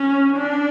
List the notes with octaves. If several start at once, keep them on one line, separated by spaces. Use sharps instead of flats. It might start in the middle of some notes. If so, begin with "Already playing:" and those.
Already playing: C#4
D4